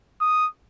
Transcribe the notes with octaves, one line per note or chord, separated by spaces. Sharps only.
D#6